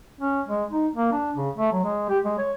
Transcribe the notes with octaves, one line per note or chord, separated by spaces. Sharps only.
C#4
G#3
D#4
A#3
D4
C#3
A3
F#3
G#3
G4
G#3
C#5